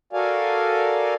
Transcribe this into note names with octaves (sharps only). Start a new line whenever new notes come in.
F#4 A4 A#4 D5 F5 G#5